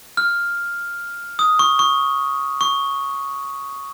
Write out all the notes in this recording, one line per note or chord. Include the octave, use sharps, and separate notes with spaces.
F6
D#6
C#6
C#6
C#6